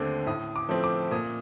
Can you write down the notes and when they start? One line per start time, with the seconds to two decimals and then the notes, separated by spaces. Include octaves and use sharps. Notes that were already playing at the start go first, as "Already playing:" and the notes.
Already playing: D#2 D3 A3 C4 D6
0.27 A2 D#6
0.56 D6
0.69 F3 A3 C4
0.84 D6
1.11 A#2 D#6